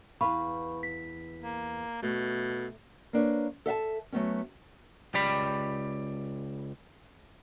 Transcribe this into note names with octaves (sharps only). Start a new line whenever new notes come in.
E2 B4 F5 B5 C#6
B6
A#3
B2 A3
A#3 D4 B4 C#5
A4 E5 F5 A5
F#3 A3 B3 C#4
C#2 G4 D5 B5